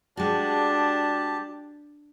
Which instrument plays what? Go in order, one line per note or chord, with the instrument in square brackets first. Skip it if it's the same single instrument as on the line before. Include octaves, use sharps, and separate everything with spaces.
[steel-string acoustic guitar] G#3 F#4 [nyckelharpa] D4 [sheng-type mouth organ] G4 A5